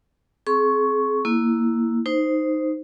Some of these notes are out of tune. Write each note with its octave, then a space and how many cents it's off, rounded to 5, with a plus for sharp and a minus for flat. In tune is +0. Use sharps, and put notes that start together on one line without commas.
C4 +0 G#4 +35 C#6 +0
A#3 +0 E4 +0
D#4 +0 C5 -5